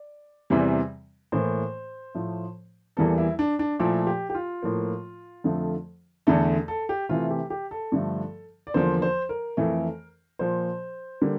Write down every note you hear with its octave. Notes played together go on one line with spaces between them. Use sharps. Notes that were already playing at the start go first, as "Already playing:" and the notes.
Already playing: D5
E2 C3 E3 G3
A2 E3 A#3 C5
A2 F3 A3
E2 E3 G3 A#3 A4
E4
D4
D4
A#2 F3 A3 E4
G4
G4
F4
A2 F3 A#3
F2 D3 F3 A3
E2 D3 A3 A4
A4
G4
C3 E3 A3 F4
G4
G4
A4
G2 D3 F3 A3
D5
E2 D3 F3 A#3 C5
C5
A#4
F2 E3 A3
A#2 F3 A#3 C5
D3 G3 A#3